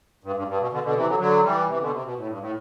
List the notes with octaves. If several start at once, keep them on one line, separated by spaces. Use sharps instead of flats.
G2
G2
G2
B2
B2 D3
B2 D3
C3 E3
D3 F#3
D3 F#3
E3 G3
C3 E3
B2 D3
C3
B2
A2
G2
A2